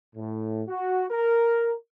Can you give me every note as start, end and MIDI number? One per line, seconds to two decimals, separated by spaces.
0.16 0.62 45
0.68 1.05 66
1.10 1.73 70